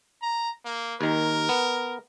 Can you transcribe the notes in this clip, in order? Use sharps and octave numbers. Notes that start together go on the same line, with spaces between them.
A#5
A#3
D#2 D#3 A#4
B3